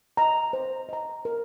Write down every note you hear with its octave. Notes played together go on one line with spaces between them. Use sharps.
D#5 A#5
C5
D#5 A#5
A#4